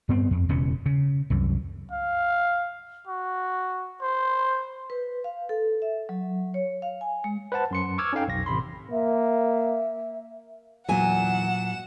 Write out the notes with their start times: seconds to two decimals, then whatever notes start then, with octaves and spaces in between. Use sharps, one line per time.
0.09 G2 B3 C4
0.31 F2
0.49 E1 E2 C#3 C#4
0.86 C#3
1.30 C2 F#2
1.92 F5
3.08 F#4
4.02 C5
4.90 B4
5.24 F5
5.49 A4
5.82 E5
6.09 F#3
6.54 C#5
6.82 F5
7.01 G#5
7.24 G#3
7.52 B4 C5 F#5 A5
7.71 F#2 C6 C#7
7.98 C#6 D6 E6 F6 G#6
8.13 C#4 D#4 A4 F5 G5
8.28 B1 F2 A#6
8.46 A1 C3 B5 C6
8.91 A#3 E5
10.89 E2 A#2 F#3 F#5 G#5 E7